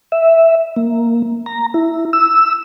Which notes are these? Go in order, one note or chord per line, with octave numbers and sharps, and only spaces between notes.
E5
A#3
A#5
E4
E6